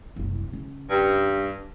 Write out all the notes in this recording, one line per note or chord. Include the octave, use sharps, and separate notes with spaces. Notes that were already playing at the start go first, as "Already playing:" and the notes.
F#1 C2
C#3 C#4
G2